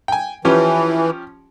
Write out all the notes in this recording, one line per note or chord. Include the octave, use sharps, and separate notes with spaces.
G5 G#5
E3 F3 C#4 G4